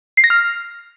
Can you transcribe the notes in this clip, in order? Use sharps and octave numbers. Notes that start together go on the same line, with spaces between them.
C7
A#6
F6